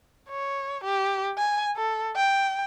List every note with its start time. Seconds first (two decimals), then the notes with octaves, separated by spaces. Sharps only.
0.29 C#5
0.84 G4
1.38 G#5
1.76 A4
2.16 G5